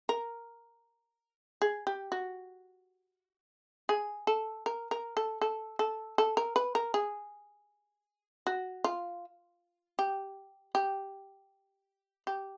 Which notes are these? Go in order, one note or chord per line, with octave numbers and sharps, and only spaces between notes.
A#4
G#4
G4
F#4
G#4
A4
A#4
A#4
A4
A4
A4
A4
A#4
B4
A#4
G#4
F#4
F4
G4
G4
G4